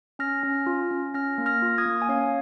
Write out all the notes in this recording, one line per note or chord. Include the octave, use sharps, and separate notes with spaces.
C#4 F6 A#6
C#4
F4
C#4
C#4 F6 A#6
A#3
F6 A#6
F4
D#6 G#6
A#3
G#5
C#4 C#5 F5